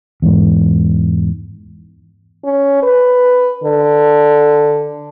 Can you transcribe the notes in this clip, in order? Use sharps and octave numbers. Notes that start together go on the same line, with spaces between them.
E2 G#2
C#4
B4
D3